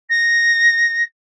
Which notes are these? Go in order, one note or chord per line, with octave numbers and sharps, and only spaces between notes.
A#6